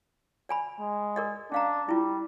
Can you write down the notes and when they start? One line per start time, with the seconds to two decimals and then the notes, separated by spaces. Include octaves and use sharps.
0.49 D5 G#5 B5
0.80 G#3
1.16 A#4 D5 D#5
1.52 C#4 D4 F5 A#5
1.89 G3 E4 F4